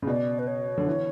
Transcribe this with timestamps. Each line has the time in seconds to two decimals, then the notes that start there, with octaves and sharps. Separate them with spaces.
0.02 C#3
0.07 B2 D5
0.39 B4
0.47 C#5
0.78 D3
0.86 E3